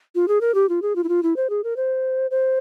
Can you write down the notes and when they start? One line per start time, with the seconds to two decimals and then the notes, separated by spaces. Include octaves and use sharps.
0.15 F4
0.28 G#4
0.41 A#4
0.54 G4
0.69 F4
0.82 G#4
0.96 F4
1.04 E4
1.09 F4
1.23 E4
1.36 C5
1.50 G#4
1.64 A#4
1.76 C5
2.31 C5